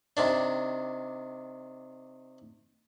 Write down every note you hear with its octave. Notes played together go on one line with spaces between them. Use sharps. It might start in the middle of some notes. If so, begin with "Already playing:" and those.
C3 D#3 D4